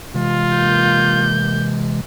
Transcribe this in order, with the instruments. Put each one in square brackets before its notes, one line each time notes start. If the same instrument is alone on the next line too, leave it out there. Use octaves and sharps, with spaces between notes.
[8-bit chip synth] C3 E3 G#3 [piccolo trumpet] F4
[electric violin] A#3 G6